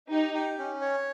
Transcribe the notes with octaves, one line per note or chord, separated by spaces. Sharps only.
D#4 G4
G4
C#4
C#5